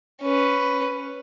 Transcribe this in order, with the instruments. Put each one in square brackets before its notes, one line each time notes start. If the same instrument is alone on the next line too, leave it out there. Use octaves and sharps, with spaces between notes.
[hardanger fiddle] C#4 B4